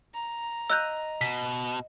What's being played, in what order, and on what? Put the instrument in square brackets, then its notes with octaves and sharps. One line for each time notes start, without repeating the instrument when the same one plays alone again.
[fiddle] A#5
[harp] D#5 [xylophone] E6 F#6 G6
[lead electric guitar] B2 [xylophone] B6